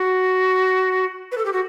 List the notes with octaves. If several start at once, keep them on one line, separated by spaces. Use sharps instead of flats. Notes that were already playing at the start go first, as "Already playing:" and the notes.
Already playing: F#4
B4
A4
G4
F#4